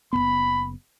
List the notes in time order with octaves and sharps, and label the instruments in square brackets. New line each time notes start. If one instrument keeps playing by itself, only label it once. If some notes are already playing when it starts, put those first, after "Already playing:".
[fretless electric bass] F#1 F#2 B3 [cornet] B5